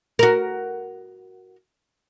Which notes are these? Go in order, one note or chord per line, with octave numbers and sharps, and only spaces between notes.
F#4 A#4